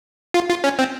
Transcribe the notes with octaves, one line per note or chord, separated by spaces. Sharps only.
F4
F4
C#4
C4